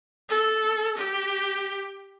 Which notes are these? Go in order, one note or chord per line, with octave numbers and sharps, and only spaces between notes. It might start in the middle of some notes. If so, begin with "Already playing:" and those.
A4
G4